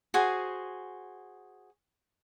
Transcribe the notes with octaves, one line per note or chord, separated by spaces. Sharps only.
F#4 G#4 C5 G#5